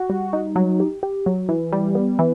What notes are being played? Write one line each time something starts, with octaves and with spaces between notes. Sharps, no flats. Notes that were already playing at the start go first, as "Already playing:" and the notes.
Already playing: F#4
G3
D#4
F#3
G4
G4
F#3
E3
G3
B3
E3